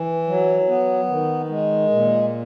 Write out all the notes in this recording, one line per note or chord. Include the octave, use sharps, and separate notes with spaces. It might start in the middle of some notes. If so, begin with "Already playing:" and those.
Already playing: E3
F#3
B3
D#3
G#3
A#2